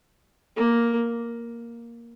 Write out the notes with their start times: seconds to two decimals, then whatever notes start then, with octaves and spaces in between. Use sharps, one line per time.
0.57 A#3